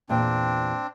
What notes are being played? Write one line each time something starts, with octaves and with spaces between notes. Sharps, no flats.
E2 A#2 C4 D4 G5